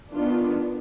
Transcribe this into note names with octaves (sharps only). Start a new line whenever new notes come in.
D#3 B3 D4 F4